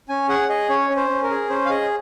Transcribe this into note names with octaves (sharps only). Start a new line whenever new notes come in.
C#4 G#5
G#4 F#5
G#4 D#5
C#4 C#5
C#4
C5
C#4
A#4
G#4
C#4 C5
F5
G#4 D#5